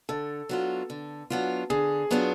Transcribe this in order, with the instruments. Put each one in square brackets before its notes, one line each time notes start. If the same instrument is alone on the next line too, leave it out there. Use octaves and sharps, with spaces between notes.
[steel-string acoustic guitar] D3 [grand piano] A4
[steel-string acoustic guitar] F#3 B3 D4 F4
D3
F#3 B3 D4 F4
[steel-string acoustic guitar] D3 [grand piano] G#4
[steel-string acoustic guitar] F#3 B3 D4 F4